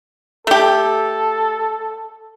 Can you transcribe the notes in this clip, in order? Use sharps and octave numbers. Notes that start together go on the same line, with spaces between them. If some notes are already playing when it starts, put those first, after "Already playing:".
A3 G4 A4